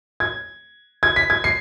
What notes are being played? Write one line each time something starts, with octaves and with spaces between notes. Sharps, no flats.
G#6
G#6
B6
G#6
C7